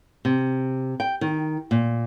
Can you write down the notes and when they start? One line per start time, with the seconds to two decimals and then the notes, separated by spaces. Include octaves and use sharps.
0.25 C3
1.00 G5
1.21 D#3
1.71 A#2